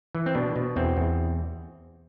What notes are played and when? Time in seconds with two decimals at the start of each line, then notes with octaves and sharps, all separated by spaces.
0.15 E3
0.26 C4
0.35 B2 D4
0.56 B2
0.76 E2 C4
0.97 E2